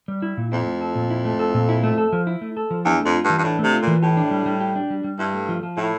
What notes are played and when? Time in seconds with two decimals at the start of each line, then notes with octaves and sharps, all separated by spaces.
0.08 G3
0.22 E4
0.37 A#2
0.52 F2 E4
0.66 A3
0.81 A4
0.95 A#2
1.10 E4
1.25 A3
1.39 A4
1.54 A#2
1.69 E4
1.83 A3
1.98 A4
2.13 F3
2.27 E4
2.41 A3
2.57 A4
2.71 F3
2.85 E2 D4
3.00 F2 A3
3.14 F4
3.24 G2
3.29 E3
3.38 G2
3.44 A2 D4
3.59 C3 A3
3.73 F4
3.82 A#2
3.87 E3
4.02 A2 G4
4.17 D4
4.31 G3
4.46 G3
4.60 G4
4.76 D4
4.90 G3
5.04 G3
5.19 G2 E4
5.34 A3
5.49 F3
5.63 F3
5.77 A2 E4